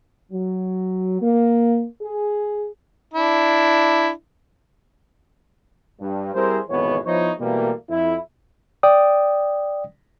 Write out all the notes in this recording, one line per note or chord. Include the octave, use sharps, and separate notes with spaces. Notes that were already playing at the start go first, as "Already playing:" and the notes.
F#3
A#3
G#4
D4 E4
G2
G3 C4 E4 G#4 A#4 C5
G#1 F2 B2 E3 B3 C#5
F3 B3 D#4 E4 C5 C#5
B2 E3 G3 A3 A#3
F2 E4
D5 G5 D#6